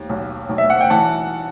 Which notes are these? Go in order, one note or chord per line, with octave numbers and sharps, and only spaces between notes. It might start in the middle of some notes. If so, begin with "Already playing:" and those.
Already playing: D#2
B1
B1
E5
F#5
G5
E3 F#5 A5